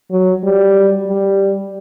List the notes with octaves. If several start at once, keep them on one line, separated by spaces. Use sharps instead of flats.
F#3
G3
G3